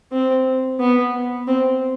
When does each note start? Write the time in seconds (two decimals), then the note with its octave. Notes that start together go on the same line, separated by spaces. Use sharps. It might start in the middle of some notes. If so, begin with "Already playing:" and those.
0.12 C4
0.80 B3
1.47 C4